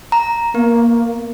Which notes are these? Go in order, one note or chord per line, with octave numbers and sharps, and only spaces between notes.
A#5
A#3 B3